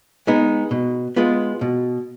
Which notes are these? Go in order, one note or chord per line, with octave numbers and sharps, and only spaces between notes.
G#3 B3 D#4
B2
G#3 B3 F4
B2